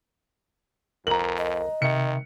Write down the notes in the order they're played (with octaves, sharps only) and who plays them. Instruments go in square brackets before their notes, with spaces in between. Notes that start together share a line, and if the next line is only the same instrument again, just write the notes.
[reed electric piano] C2 A#4 [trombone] F2 [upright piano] A#5 F#7
[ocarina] D#5
[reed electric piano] C3 E5 [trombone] D#3 [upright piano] C#7